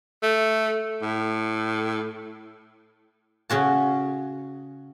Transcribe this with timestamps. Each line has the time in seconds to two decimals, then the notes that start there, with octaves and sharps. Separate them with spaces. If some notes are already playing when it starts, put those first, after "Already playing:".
0.23 A3
1.02 A2
3.50 C#3 C#4 F#4 A5